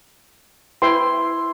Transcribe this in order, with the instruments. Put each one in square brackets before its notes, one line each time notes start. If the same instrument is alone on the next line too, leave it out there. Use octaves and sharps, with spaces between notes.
[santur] E4 C5 [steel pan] B4 G5 C6